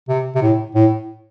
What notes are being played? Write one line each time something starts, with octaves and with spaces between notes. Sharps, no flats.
C3
C3
A2
A2